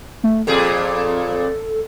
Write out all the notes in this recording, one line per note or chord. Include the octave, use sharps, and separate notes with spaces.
A3
F2 A#2 G#4 A4